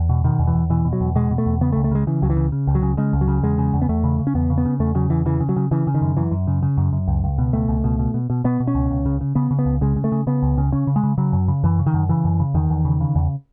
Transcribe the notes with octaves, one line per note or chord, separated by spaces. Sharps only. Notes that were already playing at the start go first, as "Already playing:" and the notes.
Already playing: E2
B2
B2 D#3
E2
E3
E2
B2 E3
B2
F#3
E2
B2 G#3
B2
A3
E2
C#3 B3
A3
C#2
A3
C#3 G#3
C#3 E3
C#2 F#3
E3
C#3
C#3
C#2
F#3
C#3
C#3 G#3
C#2
F#3
C#3
E2 G#3
C#3
E2
B3
E2 A3
C#3
C#3
C#4
E2 B3
C#3
B3
C#3
E2 A3
C#3 F#3
E2 E3
C#3 E3
C#3
F#3
C#3
C#3 E3
C#3
D#3
F#2
F#2 E3
F#2
C#3
C#3
F#2
F#2
C#2
C#2
B2
C#2 A3
C#2
B2
B2
B2
B2
B2 B3
B2
C#4
C#2
C#2
C#3
C#3
C#3 B3
C#3
B3
C#2
C#3 G#3
C#3
A3
C#3
C#3 B3
C#2
C#3
C#3 C#4
C#3
G#3
C#3
C#3 F#3
F#2
C#3
F#2 E3
C#3
D#3
F#2
C#3 E3
F#2
C#3
E2 D#3
E2
C#3
C#3
E2